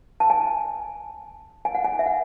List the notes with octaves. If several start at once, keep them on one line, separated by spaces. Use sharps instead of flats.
A5
G#5
G#5
F#5
G#5
E5
F#5